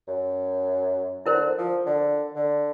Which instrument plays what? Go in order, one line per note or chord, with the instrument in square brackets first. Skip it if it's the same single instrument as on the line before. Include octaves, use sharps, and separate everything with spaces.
[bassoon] F#2
[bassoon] D3 [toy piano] E4 A#4 C5
[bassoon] F3
D3
D3